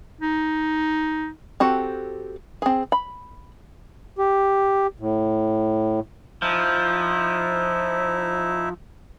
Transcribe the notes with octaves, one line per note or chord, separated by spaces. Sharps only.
D#4
C4 F#4 G4 A4
C4 G#4
B5
G4
A2
F3 D#4 E4 E5